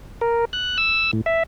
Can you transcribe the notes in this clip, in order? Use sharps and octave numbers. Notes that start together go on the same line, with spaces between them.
A#4
F#6
E6
A2
E5